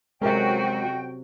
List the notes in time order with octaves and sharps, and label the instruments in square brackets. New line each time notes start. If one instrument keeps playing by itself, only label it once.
[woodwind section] F2 G5 [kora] C3 C#4 [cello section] F#3 F#4 [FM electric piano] G#3 A#4